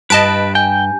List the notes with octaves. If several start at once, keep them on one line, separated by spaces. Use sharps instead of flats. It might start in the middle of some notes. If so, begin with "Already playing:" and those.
G2 B4 D#5 A5 D7
G5 G#5 G6